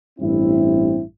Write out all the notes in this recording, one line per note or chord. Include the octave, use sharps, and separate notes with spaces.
A1 G2 C4 E4